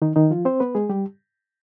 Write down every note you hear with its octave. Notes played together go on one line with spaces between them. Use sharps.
D#3 D#4
D#3 D#4
F3 F4
C4 C5
B3 B4
G#3 G#4
G3 G4